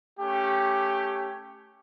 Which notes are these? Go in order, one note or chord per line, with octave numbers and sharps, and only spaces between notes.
A3 C#4 G4